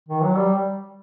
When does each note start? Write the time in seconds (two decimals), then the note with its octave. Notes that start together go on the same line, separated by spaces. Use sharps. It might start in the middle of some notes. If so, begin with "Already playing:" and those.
0.09 D#3
0.23 F#3
0.37 G3